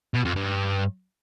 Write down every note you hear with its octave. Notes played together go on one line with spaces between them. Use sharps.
B2
F2
G2